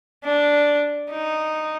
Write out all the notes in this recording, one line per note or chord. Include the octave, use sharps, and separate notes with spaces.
D4
D#4